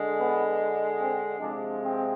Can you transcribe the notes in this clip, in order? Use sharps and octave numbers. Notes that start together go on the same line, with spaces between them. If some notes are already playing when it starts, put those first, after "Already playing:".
Already playing: D3 G#3
B3
C4
C3 F3 G#3 D4
C4